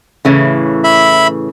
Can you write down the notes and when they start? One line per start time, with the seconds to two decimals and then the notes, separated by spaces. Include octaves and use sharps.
0.25 A2 C#3 E3
0.84 E5 B5